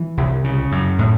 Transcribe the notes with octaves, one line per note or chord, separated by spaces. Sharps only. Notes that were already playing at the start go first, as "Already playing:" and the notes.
Already playing: E3
C2
C#3
F#2
A2